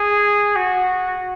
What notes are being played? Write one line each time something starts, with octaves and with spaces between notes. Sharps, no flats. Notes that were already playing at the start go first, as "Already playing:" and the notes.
Already playing: G#4
F#4